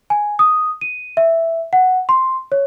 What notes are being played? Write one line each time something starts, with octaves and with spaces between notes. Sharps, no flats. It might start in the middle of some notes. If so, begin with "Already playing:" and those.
G#5
D#6
D#7
E5
F#5
C6
C#5